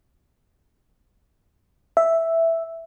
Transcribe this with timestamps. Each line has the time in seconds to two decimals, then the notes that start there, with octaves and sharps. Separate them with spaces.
1.97 E5